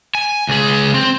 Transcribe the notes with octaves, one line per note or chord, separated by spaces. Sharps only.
G#5
C#2 G#4
C4